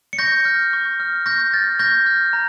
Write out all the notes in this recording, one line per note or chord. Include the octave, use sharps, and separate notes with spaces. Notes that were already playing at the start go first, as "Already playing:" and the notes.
C#7
C#6 G6 A#6
F6
C#6
F6
C#6 G6 A#6
F6 A6
C#6 G6 A#6
F6
A#5